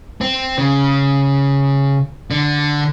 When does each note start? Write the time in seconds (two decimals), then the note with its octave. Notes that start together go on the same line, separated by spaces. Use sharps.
0.21 C4
0.58 C#3
2.30 D3